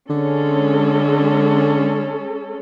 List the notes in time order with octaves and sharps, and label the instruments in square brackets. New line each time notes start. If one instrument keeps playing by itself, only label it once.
[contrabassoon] D3 [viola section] G#3 C#4 A4